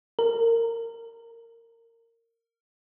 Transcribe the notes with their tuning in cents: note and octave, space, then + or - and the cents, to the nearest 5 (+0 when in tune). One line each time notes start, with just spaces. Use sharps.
A#4 -20